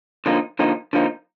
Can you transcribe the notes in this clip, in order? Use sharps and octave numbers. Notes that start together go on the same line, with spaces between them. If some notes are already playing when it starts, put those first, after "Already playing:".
D3 F3 A#3 D#4
D3 F3 A#3 D#4
D3 F3 A#3 D#4